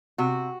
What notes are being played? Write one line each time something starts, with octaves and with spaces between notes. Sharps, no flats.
C3 F#4